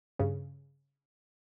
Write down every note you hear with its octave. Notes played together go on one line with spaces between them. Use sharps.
G2 C#3